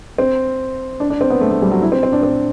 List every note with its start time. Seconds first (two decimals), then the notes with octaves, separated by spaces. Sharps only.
0.18 C4
1.00 D4
1.10 D4
1.21 C4
1.30 B3
1.41 A3
1.51 A3
1.62 G3
1.72 F#3
1.82 E4
1.92 C4
2.03 C4
2.13 D4
2.23 C4